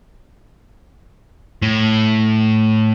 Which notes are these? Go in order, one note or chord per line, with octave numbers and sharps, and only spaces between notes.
A2